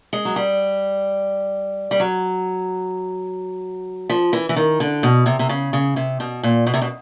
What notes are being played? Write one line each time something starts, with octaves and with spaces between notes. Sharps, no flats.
G#3
F#3
G3
G3
F#3
F3
E3
E3
D#3
D3
B2
C3
C3
C#3
C#3
C3
B2
A#2
B2
C3
B2